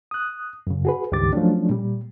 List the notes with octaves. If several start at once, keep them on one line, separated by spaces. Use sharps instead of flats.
D#6 F#6
F#2 C#3
F#4 G#4 B4
C#2 G2 D#3 G4 D6 A6
F3 F#3 A3 C#4 D4
A#2 G3